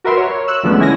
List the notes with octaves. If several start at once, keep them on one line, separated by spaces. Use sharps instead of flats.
F#4 A#4 B4 E5 C6
C#5
E6 F#6
D3 F3 G#3 A3 B3 C#4
C#4 E4 G#5 A#6